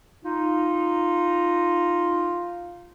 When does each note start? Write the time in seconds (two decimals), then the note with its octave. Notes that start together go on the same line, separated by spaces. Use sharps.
0.24 D#4 F4